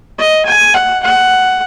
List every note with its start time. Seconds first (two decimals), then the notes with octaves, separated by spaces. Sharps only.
0.18 D#5
0.46 G#5
0.74 F#5
1.03 F#5